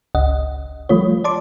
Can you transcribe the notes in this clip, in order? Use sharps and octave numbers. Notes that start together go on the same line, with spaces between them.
G1 C#2 D#5 F#5
F3 G3 A3 F4 C#5
D5 A5 C6 D6